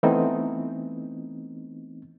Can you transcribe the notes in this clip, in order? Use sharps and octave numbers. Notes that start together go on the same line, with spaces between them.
E3 A3 B3 C4 D#4